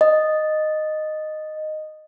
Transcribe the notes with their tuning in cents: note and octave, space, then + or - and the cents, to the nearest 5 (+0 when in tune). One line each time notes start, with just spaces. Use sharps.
D#5 -10